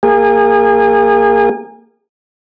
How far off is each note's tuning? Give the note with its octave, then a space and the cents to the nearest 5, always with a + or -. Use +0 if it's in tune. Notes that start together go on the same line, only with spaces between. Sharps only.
A#3 -15 G#4 -30